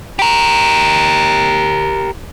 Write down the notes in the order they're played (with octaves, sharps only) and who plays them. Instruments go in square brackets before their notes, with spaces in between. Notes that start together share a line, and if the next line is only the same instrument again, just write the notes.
[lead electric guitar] G4 A#4